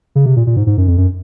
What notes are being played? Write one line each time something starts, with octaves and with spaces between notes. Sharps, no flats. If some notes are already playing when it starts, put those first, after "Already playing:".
C#3
C3
A#2
A#2
G#2
G#2
F#2
F2
F#2